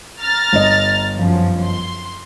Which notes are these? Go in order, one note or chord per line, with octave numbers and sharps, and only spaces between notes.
A#5 F6 A6
G1 D#5
F#2 F3
C6